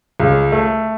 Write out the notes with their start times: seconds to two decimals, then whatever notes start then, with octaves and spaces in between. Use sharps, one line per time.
0.20 C#2
0.52 A3